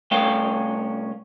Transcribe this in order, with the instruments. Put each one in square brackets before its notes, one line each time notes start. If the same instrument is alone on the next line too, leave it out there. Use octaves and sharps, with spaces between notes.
[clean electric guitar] C2 A3 C#4 F5 G5